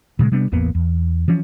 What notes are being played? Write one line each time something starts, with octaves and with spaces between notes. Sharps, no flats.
A#2 C#3 F3 G#3
C3 G3 B3 D4
A1 E2 A#3 B3
E2
E3 F3 C#4